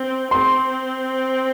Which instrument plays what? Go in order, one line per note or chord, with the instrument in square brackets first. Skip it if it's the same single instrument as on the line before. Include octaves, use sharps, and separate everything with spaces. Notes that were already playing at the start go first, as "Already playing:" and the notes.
Already playing: [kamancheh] C4
[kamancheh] C4 [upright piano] C6